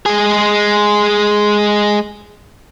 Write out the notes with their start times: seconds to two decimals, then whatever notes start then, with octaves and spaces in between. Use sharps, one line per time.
0.06 G#3 G#4